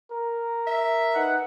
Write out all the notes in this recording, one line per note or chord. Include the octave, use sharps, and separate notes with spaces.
A#4
E5
D#4 B4 F#5